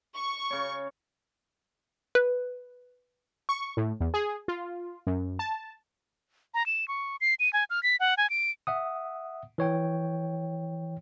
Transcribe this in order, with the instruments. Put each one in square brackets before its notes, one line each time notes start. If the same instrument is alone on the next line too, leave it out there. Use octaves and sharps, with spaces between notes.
[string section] C#6
[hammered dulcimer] C#3 C#5
[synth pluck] B4
[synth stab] C#6
A2
E2
G#4
F4
F#2
A5
[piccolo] A#5
E7
C#6
C7
D#7
G#5
F6
B6
F#5
G#5
D7
[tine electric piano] E5 F#5 D#6
E3 C#5 G5